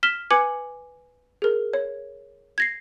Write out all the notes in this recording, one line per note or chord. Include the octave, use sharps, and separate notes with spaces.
F6 B6 E7 G7
B4 G#5 D6 G#6 C#7 F#7
G#4 A#4
C#5
G#6 A#6 C7